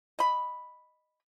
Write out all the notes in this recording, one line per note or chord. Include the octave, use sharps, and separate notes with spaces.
D#5 B5